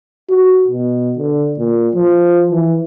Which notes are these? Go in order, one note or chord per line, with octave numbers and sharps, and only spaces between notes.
F#4
B2
D3
A#2
F3
E3